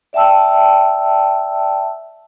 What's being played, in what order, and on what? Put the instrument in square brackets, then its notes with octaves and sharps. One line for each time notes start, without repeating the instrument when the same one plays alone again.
[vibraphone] D5 E5 G5 A5 E6